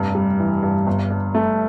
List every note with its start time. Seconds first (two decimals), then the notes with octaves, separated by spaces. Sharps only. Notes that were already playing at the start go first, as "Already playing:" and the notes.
Already playing: F1 G2
0.15 G3
0.39 E3
0.63 G2
0.87 G1
1.11 G2
1.35 A3